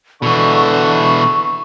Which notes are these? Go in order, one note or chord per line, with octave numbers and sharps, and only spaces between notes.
B2 D3 E3 C#6